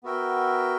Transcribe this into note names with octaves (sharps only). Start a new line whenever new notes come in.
B3 F#4 A#4 E5 G5